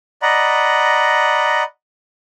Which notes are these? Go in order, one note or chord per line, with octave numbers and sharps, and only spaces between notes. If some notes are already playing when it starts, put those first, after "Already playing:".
D5 D#5 F#5 A#5 B5